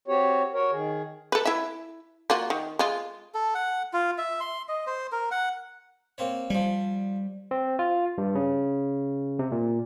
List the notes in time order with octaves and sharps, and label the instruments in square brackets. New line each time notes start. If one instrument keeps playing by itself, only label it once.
[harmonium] C4 F#4 G4 C#5
F#4 A#4 C#5
D#3 G#4
[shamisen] A4 B4
E4 E5
A#3 F4 F#4
D#3
G#3 F4
[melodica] A4
F#5
F4
E5
C6
D#5
C5
A#4
F#5
[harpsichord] A#3 C4 C#5
[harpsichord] F3 G#5 [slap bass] G3
[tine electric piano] C4
F4
G2
C#3
C3
A#2